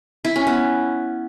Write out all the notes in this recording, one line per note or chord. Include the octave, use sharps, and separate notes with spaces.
E4
C#4
B3